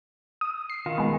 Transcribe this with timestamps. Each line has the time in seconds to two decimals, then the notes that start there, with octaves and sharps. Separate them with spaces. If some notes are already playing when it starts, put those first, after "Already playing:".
0.41 D#6
0.70 C7
0.86 D#3 F4
0.98 G#3 B3